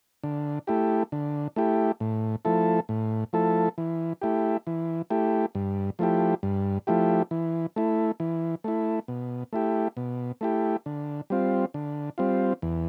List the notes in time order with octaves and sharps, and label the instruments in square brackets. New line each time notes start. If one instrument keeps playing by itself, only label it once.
[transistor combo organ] D3
A3 E4 G4
D3
A3 E4 G4
A2
F3 A3 E4 A4
A2
F3 A3 E4 A4
E3
A3 E4 G4
E3
A3 E4 G4
G2
F3 A3 E4 G4
G2
F3 A3 E4 G4
E3
A3 E4
E3
A3 E4
B2
A3 E4 G4
B2
A3 E4 G4
D3
G3 C4 F4
D3
G3 C4 F4
E2